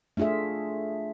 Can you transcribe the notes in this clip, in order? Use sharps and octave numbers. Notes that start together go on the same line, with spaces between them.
A3 D4 F4 G#4 E5